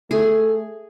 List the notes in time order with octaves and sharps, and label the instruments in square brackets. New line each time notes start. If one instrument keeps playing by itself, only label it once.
[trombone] A3 [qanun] G#4